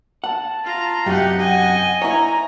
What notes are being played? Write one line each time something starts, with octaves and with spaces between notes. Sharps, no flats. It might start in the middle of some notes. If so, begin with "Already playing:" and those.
F#5 A5
F4 A#5
F#2 C3 D#4 G4 F#5 G5
D#5 F#5 G#5
E4 C#5 A#5 A#6